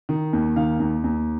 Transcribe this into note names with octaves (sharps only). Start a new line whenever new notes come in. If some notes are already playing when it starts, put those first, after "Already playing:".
D#3
D#2
D#3 F5
D#2
D#2